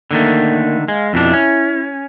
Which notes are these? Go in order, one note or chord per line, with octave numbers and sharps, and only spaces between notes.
D3 D#3 A3 A#3
G#3 F5
F2 B2 D4 E4
C#4